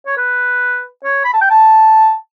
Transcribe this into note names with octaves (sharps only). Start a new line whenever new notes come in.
C#5
B4
C#5
B5
A5
G5
A5